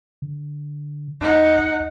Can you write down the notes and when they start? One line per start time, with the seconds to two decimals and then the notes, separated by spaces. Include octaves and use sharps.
0.22 D3
1.21 E2 D#4 F#5
1.59 D#2